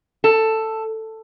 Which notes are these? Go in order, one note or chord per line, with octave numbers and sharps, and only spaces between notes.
A4